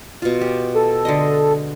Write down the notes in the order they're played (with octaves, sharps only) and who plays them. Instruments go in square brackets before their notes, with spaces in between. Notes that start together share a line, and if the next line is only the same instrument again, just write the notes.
[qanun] B2 F4
G4
[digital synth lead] A4
[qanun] D3 G#3 D#5